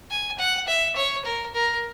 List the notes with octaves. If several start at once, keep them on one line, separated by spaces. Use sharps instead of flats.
G#5
F#5
E5
C#5
A#4
A#4